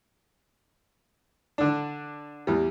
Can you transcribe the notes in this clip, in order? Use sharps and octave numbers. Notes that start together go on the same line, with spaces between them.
D3 D4
E2 G3